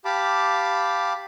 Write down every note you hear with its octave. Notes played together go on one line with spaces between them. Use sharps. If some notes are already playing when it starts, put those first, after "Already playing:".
G4 F5 A5 B5 D6